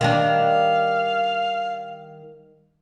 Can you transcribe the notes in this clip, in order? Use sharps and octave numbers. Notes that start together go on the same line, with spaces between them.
D#3 G3 D4 F5